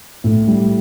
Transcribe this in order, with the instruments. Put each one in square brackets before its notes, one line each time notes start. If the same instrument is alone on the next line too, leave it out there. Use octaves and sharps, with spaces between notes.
[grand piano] A2
G3